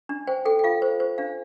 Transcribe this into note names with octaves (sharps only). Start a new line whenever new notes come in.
D4
C5 G5
A4 G5
G5
F4 F5
C5
C5
D4 F5